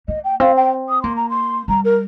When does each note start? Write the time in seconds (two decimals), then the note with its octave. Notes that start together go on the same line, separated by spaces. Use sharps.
0.08 A#3 D#5
0.24 G5
0.40 C4 F5
0.56 G5
0.89 D#6
1.02 A#3 C6
1.16 A#5
1.29 C6
1.68 G3 A#5
1.84 A#4